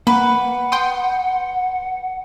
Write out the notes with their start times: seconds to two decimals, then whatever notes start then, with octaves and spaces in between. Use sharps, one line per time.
0.07 A#3 B4 F#5
0.72 G5 C6 D#6